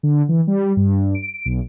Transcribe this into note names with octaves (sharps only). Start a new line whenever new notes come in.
D3
E3
G3
G2
D7
B1